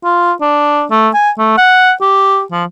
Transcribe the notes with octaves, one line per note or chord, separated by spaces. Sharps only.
F4
D4
A3
G#5
A3
F#5
G4
F3